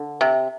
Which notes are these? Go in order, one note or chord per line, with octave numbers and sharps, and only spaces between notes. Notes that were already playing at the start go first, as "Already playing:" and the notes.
Already playing: D3
C3